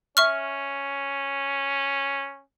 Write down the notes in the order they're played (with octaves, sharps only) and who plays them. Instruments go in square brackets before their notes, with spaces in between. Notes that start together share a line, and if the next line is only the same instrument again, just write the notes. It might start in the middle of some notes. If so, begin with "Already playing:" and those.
[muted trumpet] C#4 [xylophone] E5 C#6 F6